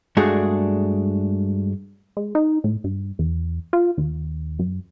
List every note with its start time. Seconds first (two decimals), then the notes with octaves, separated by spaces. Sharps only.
0.17 G2 G#3 A3 D4 F#4 G#4
2.17 G#3
2.35 D#4
2.64 A2
2.84 G2
3.19 E2
3.73 F4
3.97 D#2
4.59 F#2